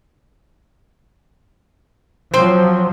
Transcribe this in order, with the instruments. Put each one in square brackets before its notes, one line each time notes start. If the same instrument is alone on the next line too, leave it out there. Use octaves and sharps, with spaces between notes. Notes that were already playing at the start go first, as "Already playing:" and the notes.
[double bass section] F3 F#3 [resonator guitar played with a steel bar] C4 C5